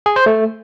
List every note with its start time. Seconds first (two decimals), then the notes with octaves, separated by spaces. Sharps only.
0.06 G#4
0.16 C5
0.26 A3